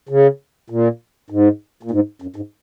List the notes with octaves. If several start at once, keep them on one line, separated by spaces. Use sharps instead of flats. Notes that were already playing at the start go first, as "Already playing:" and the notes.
C#3
A#2
G#2
A#2
G#2
F#2
G#2